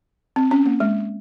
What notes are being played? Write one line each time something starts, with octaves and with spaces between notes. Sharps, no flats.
C4
C#4
A#3
G#3